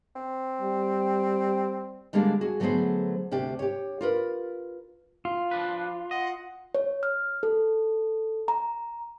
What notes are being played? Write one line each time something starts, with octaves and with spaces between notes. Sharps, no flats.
C4
G3
D3 G3 G#3 A#3 D4
F#4 G#4
D3 F#3 A3 B3 G#4 C5
D2 C3 D4 G4
G4 C#5
F4 A#4 B4
F4
F3 D4 B4
D#5 F#5
C#5
F6
A4
A#5